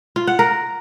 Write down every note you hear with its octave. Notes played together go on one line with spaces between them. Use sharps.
F4
F#5
A#4